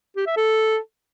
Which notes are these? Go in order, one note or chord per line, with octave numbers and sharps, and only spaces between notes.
G4
E5
A4